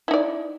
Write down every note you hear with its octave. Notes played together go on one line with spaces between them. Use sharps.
D#4 E4 D5